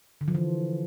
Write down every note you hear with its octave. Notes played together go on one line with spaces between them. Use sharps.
D3
F3
E3